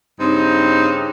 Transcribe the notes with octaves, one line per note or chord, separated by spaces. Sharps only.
G2 C#3 C4 D#4